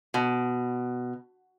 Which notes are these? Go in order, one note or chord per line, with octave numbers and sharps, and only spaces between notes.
B2